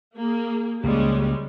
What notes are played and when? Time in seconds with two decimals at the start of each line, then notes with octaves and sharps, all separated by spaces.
0.16 A#3 G#4
0.84 C#2 G3 G#3 A#3 C#4